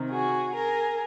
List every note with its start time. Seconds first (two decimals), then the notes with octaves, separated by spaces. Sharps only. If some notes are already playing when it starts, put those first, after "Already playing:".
Already playing: C3 D#3
0.10 F#4 G#4
0.54 G#4 A#4